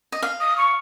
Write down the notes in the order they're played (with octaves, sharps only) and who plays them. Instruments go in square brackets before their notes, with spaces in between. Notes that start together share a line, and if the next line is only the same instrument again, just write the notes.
[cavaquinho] D#5
F5
[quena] D#6
C#6